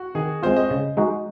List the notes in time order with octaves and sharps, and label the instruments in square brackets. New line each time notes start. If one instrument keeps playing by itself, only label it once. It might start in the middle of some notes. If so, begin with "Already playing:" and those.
Already playing: [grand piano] F#4
[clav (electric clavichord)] D#3 [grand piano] G#4
[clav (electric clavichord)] G#3 C4 F4 [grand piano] C5
[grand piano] D#5
[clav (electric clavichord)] C#3
G#3 D#4 F#4